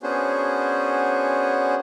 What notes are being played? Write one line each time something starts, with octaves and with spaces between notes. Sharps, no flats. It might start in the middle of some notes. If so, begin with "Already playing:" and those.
B3 C#4 D4 F#4 G#4 C5